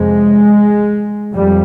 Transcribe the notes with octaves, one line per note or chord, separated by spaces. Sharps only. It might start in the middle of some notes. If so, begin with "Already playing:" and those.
Already playing: F2 C3 G#3
F2 G3